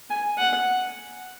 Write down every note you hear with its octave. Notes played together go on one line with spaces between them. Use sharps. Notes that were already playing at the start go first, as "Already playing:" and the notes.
G#5
F#5